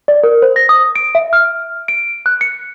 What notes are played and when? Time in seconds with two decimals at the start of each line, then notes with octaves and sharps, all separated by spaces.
0.08 D5
0.23 A#4
0.42 C5
0.56 A#6
0.69 D#6
0.96 D7
1.15 E5
1.33 F6
1.88 D7
2.26 F#6
2.41 C#7